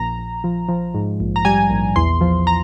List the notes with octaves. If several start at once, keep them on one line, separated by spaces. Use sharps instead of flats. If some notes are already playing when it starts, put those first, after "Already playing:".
Already playing: A#1 A#5
A#1
F3
F3
G#2
A#1
A#5
G3 G#5
A#1
E2 C6
F3
A#5